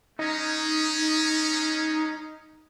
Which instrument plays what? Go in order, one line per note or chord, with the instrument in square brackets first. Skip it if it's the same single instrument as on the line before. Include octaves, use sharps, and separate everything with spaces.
[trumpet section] G#3 C#4 [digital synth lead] D#4